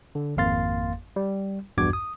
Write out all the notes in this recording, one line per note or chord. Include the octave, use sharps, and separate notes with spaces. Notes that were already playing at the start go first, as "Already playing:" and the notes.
D3
G#1 F2 A#3 F5 C6 A6
G3
A#1 E2 G2 F#4 D6 G#6
D#6